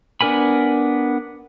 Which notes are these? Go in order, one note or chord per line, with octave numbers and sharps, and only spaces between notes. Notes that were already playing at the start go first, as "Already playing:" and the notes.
B3 D4 A#4 G#5 B5